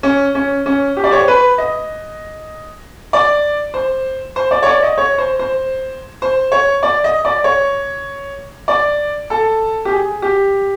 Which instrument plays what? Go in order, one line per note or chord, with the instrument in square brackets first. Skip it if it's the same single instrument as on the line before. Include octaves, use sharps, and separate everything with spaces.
[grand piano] C#4
C#4
C#4
G4
D5
C#5
C5
B4
D#5
D5
C5
C5
D5
C#5
D5
D#5
C#5
C5
C5
C5
C#5
D5
D#5
D5
C#5
D5
A4
G4
G#4
G4